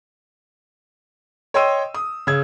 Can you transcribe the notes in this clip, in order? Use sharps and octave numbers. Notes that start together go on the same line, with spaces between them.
C#5 D#5 G5 C6 E6 D#7
D#6
C#3 E6 G#6